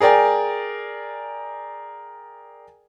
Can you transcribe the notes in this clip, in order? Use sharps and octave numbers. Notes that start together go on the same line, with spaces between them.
G#4 A#4 D5 G5 G#5